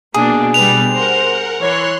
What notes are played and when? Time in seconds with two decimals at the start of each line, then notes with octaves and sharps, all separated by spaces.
0.14 B2 A#3 D4 G#4
0.54 G3 B4 F7
0.92 A#4 C5 F#5
1.60 E3 C#5 C6 F#6